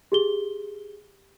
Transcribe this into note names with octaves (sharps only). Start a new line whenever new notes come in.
G4 G#4 G7